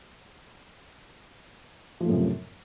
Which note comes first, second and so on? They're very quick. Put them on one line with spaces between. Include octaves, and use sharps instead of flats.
F3 A2 F#2 C3